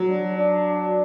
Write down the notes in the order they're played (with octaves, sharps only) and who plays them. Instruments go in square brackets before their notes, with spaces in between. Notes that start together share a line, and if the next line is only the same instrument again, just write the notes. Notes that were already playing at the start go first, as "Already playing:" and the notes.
Already playing: [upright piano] F#3
[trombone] D4
D4